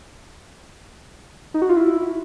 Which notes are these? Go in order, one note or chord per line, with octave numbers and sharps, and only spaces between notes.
D#4
F#4
F4
E4